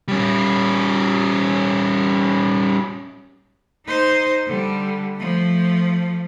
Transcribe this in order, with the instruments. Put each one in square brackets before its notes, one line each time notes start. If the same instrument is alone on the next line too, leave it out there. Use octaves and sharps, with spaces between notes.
[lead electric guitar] G3 C#4
[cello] D#4 C5
D3 G3
F3 A3